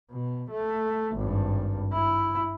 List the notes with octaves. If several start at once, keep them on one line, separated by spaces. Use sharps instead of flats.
B2
A3
G#1 G2
E4